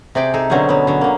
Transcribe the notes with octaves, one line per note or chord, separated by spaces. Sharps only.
C3 G#4 D5 G5
D#4 G#4 A4
B2 D3 F#3 C4 C#4 G#4
F#3 B3
D3 F#3
D3 A#3